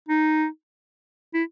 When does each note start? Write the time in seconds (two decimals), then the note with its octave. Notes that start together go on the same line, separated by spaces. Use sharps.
0.08 D#4
1.34 E4